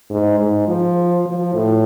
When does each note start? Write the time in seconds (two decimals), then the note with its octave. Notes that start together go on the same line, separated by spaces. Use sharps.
0.10 G#2
0.39 G#2
0.68 F3
1.26 F3
1.54 A2